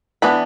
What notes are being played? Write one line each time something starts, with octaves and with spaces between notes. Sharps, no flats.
E3 B3 D4 B5